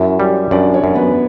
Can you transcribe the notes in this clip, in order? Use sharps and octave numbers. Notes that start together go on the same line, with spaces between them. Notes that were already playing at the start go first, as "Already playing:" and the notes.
Already playing: F#2 E4 E5
G3
F#2 D4 D5
C#4 C#5
F#2
B3 B4